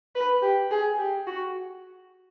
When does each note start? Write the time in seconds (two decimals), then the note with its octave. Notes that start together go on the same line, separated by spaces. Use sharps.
0.15 B4
0.43 G4
0.71 G#4
0.99 G4
1.27 F#4